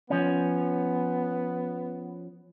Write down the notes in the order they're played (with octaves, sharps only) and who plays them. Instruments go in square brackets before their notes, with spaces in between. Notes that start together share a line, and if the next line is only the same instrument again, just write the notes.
[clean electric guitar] F3 C#4 [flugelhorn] B3